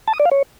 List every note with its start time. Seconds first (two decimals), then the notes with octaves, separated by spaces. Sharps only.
0.08 A5
0.14 D#6
0.19 D5
0.25 F5
0.31 C#5